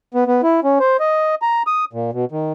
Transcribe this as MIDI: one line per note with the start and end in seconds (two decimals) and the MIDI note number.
0.14 0.24 59
0.27 0.41 59
0.43 0.60 64
0.64 0.79 61
0.80 0.97 72
1.00 1.35 75
1.42 1.63 82
1.67 1.85 87
1.93 2.11 46
2.13 2.25 47
2.32 2.53 51